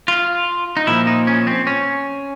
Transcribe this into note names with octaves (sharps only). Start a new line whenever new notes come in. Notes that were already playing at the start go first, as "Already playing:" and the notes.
F4
D#4
A#2 F3 E4
D#4
C#4
C4
C#4